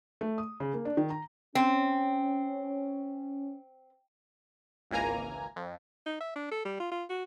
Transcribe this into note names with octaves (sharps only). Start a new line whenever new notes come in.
A3
D#6
C#3
A#3
D4
D#3
A#5
C4 C#4
G#1 C#2 E3 A#3 G#5 A#5
F2
D#4
E5
D4
A4
G3
F4
F4
F#4